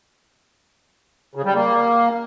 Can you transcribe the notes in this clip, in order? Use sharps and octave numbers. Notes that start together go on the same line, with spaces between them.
C#3
G3
A#3